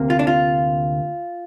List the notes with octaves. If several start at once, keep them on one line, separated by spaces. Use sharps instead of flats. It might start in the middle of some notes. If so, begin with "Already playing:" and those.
Already playing: D2 C3 A#3
F4
D4
F4